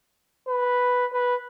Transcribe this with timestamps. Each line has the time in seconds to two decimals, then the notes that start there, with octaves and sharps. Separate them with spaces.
0.48 B4
1.13 B4